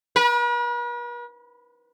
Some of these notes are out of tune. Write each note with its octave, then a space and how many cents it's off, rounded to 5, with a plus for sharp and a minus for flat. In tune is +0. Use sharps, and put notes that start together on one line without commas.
B4 -45